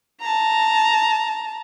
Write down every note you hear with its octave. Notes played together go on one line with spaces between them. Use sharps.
A5 A#5